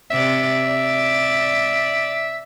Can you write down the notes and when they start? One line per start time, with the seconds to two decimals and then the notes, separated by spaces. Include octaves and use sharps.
0.11 C3 D5 E5
0.66 D5